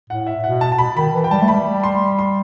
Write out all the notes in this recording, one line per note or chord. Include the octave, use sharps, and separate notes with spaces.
A2 F#5
E5
B2 F#5
A5
A5
B2 B5
D#3 B5
E3
G5
G3 A5
A3
B5
G3
C6
C6